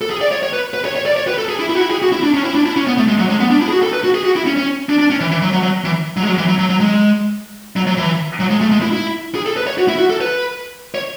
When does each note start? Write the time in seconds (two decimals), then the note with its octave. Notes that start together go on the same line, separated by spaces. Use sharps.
0.01 A4
0.11 G#4
0.21 D5
0.32 C#5
0.43 C#5
0.53 B4
0.74 B4
0.85 C#5
0.96 C#5
1.06 D5
1.17 C#5
1.28 B4
1.38 A4
1.49 G#4
1.60 E4
1.70 E4
1.75 F#4
1.81 E4
1.91 G#4
2.02 F#4
2.12 E4
2.23 D4
2.34 C#4
2.45 E4
2.55 D4
2.66 E4
2.76 C#4
2.87 B3
2.98 A3
3.08 G#3
3.19 F#3
3.30 G#3
3.40 B3
3.51 D4
3.61 E4
3.68 G#4
3.72 F#4
3.83 A4
3.93 B4
4.04 F#4
4.15 G#4
4.25 F#4
4.36 E4
4.46 C#4
4.57 C#4
4.89 D4
4.99 D4
5.10 C#4
5.20 E3
5.31 E3
5.42 F#3
5.53 F#3
5.63 F#3
5.85 E3
6.17 F#3
6.23 G#3
6.27 F#3
6.38 E3
6.48 F#3
6.59 F#3
6.70 F#3
6.80 G#3
7.76 F#3
7.87 F#3
7.97 E3
8.40 F#3
8.50 G#3
8.61 A3
8.72 G#3
8.82 E4
8.93 E4
9.35 G#4
9.46 A4
9.57 B4
9.67 C#5
9.78 F#4
9.88 E4
9.99 F#4
10.10 A4
10.21 B4
10.95 C#5